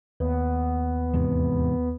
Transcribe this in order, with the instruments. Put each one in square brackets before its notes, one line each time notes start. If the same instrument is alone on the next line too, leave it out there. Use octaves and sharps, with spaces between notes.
[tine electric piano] D#2 [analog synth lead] B3
[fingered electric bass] E2 G#2 C3